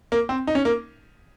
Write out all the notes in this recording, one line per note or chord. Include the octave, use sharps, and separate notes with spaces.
A#3
C4
D#4
C#4
A#3